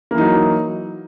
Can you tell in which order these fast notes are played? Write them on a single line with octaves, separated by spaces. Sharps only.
A#3 E3 D#4 F#3